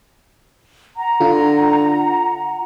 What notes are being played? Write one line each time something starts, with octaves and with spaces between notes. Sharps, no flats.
F#5 A#5
D3 F4